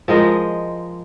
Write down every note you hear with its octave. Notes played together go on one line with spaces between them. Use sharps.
F3 G#3 A#4 D#5